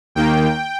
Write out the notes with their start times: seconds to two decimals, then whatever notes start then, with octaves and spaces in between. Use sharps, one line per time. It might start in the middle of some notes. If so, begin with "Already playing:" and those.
0.15 D#2 D#3 A#3 G5